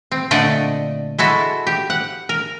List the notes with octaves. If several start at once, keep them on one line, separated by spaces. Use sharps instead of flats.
C4
A#2 D3 A3 D5 D#5 F#5
G#3 E4 F#4 A4
G4
F#5
A#4